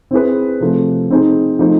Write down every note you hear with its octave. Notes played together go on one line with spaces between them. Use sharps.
C4 E4 G#4 B4
C3 F3 A3
C4 D#4 G#4 C5
F3 A3 C4 D#4